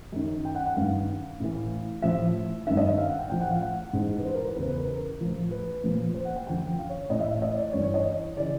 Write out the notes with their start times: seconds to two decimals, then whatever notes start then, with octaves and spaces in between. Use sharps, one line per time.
0.12 F#2 D#3
0.45 G5
0.55 F#5
0.65 F#5
0.76 G2 D#3 F5
1.40 A2 E3
2.02 A2 F3 E5
2.67 G2 D#3 E5
2.77 D#5
2.87 E5
2.98 F5
3.09 F#5
3.19 G5
3.30 A2 F3 G5
3.40 F#5
3.50 F5
3.61 F#5
3.93 G#2 E3
4.19 B4
4.25 C5
4.35 A#4
4.46 B4
4.56 E2 C#3 E3 C5
4.68 B4
4.77 A#4
4.88 A#4
5.20 A2 F3
5.51 B4
5.84 A#2 F3
6.14 C5
6.25 F#5
6.36 G5
6.46 F#2 D3 F3 G5
6.79 F5
6.89 C#5
7.10 A2 E3 D#5
7.20 E5
7.32 E5
7.42 D#5
7.57 D5
7.73 G2 E3 C#5
7.83 C#5
7.94 D#5
8.37 C#3 E3 D5